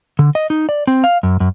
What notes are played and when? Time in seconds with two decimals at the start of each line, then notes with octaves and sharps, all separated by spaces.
0.19 D3
0.35 D#5
0.50 D#4
0.69 D5
0.87 C4
1.04 F5
1.23 F#2
1.40 F#2